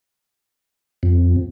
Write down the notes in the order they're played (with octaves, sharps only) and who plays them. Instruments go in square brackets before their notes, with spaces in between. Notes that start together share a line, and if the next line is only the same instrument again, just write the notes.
[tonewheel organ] F2